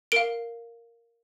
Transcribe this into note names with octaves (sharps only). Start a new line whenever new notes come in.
A#4 F5 D7